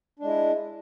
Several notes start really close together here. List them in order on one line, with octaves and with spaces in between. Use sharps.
D4 G#3 E4